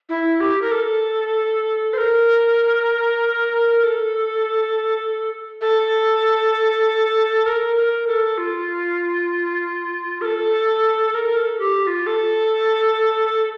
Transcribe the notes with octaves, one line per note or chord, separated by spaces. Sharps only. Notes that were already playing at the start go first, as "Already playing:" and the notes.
E4
G4
A#4
A4
C5
A#4
A#4
A4
A4
A#4
A#4
A4
F4
A#4
A4
A#4
A4
G4
G4
F4
A4